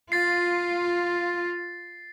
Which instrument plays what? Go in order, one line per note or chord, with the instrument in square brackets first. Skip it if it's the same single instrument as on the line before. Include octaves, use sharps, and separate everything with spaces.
[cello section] F4 [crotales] A6 C7